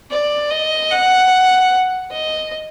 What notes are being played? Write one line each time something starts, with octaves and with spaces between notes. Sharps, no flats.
D5
D#5
F#5
D#5